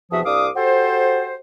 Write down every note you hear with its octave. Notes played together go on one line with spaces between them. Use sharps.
E2 C3 F3 F#4 E5 D#6
C2 D4 F5 D6 D#6
F#4 G4 A4 C5